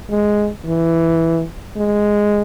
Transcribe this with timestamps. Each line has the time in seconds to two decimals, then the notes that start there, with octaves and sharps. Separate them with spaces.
0.10 G#3
0.66 E3
1.77 G#3